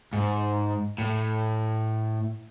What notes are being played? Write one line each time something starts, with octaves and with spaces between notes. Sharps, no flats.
G#2
A2